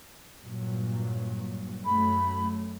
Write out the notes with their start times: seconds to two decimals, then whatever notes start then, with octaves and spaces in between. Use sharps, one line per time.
0.43 G2 A#2 F#3
1.85 F#2 F#3 A3 B5